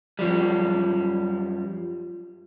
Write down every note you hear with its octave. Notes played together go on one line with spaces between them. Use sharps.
F#2 F3 G3